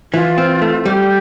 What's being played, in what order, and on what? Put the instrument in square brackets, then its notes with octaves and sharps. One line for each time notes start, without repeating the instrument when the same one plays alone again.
[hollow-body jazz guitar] E3 [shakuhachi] F4
[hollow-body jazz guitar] C4
A3
[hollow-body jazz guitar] G3 [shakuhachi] G4